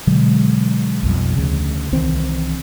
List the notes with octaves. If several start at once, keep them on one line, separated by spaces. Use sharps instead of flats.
B2 D3 F#3 G#3
B1 F2 G3
D2 C#3
C2 D#3 E3 C4